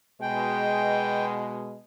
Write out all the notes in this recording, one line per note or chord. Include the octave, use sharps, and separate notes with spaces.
B2 G#3 G5